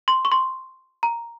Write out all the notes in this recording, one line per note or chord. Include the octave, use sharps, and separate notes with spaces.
C6
C#6
C6
A#5